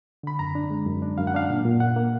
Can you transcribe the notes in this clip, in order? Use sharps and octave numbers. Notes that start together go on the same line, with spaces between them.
D3 B5
F#2 A#5
D4
G#3
F#2
D4
F#2 F5
F#5
D4 F5
A#2
A#2
A#3 F#5
A#3